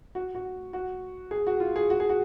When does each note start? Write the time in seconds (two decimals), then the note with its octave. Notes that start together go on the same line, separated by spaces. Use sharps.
0.15 F#4
0.35 F#4
0.73 F#4
1.31 G#4
1.47 F#4
1.60 F4
1.76 G#4
1.90 F#4
2.00 G#4
2.09 F#4